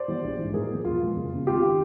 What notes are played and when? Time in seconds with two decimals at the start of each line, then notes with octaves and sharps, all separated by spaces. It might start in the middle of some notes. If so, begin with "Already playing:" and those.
Already playing: C5 D5
0.08 E3 G3 B3
0.24 A#1
0.39 G#2 E3
0.54 A2 G#4 A#4
0.70 F3 A#3
0.85 E1 F4
1.01 E2 B2 G#3
1.16 F#1
1.32 E2 C#3
1.47 G#1 F4 G4
1.66 D#3